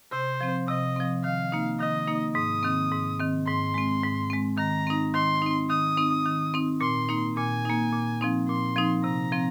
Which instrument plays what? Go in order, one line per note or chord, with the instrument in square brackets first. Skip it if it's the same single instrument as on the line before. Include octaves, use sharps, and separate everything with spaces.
[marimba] C3 [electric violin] C5
[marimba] F3 C4
[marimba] C3 [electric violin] D#5
[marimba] F3 C4
[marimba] D#3 [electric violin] F5
[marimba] A#3 D#4
[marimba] D#3 [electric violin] D#5
[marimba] A#3 D#4
[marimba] G#2 [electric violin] D#6
[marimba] D#3 C4
G#2
D#3 C4
[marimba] G#2 [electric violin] C6
[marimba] G#3 C4
G#2
G#3 C4
[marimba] D#3 [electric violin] A#5
[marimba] C4 D#4
[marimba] D#3 [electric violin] C6
[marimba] C4 D#4
[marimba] D#3 [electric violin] D#6
[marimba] C4 D#4
D#3
C4 D#4
[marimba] A#2 [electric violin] C6
[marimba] A#3 D#4
[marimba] A#2 [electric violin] G#5
[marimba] A#3 D#4
A#2
F3 C4 D#4
[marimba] A#2 [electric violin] C6
[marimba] F3 C4 D#4
[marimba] C3 [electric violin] A#5
[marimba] F3 C4